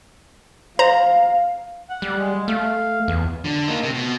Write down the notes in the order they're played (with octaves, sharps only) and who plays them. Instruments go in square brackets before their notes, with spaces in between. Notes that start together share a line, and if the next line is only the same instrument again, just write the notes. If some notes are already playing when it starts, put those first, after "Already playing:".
[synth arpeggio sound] C5 A#5 [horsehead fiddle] F5
[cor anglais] F#5
[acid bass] G3
[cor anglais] G#3
[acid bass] A3 [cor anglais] F5
[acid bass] E2
[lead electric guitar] D3
A#3 D#4
C3
B2